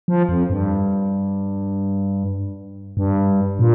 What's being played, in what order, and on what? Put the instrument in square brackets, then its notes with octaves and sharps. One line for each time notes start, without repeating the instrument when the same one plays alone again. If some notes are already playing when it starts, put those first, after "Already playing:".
[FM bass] F3
F2
G2
G2
A#2